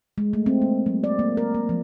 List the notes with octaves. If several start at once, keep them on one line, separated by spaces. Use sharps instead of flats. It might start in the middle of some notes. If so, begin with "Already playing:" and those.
G#3
A3
C4
A#3
F#3
D5
A#3
A#4
A#3
F3